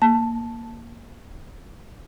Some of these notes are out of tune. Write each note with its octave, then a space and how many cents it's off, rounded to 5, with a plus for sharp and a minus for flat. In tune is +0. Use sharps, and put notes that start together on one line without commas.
A#3 +0 A5 +0